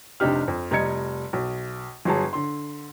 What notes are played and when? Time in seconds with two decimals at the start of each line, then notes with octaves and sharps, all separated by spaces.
0.20 F1 C3 D4 D#4 G4 F6
0.48 F2
0.71 F1 G3 D#5 A#5 G#6 C#7
1.33 B1
2.05 G1 F#3 G#4 A5
2.33 D3 C6